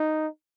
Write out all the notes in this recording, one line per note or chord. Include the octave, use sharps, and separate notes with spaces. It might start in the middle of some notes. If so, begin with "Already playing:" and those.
Already playing: D#4